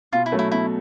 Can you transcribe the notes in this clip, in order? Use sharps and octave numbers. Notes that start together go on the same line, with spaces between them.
B2 F4
E4
F#3 A3 C#4 F#4
E4
B2 E4